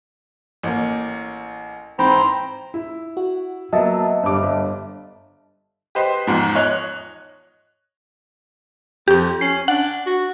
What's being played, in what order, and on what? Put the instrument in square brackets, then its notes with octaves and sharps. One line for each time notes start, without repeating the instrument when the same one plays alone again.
[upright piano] A1 A#3
[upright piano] G#2 E3 C4 [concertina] C5 G5 A#5 [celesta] B5
[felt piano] E4
[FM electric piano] F#4
[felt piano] F#3 A#3 B3 [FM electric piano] D#5 E5 A5
[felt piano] G1 G2 D6
G1
[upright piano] G4 B4 C5 D#5
E2 G#2 F3
C#5 D#5 F#6
[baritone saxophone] F2 [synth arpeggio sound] G4 G6
[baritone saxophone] C#4 [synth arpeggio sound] C7
[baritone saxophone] D4 [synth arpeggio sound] F#5
[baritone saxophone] F#4